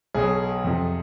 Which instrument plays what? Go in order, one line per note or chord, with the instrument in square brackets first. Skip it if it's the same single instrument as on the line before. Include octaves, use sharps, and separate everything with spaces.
[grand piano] B1 B2 F#3 G#4
F2 C3 F3